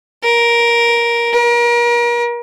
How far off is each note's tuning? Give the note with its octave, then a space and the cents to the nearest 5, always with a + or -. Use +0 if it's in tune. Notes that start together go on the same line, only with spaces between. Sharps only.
A#4 +10
A#4 +35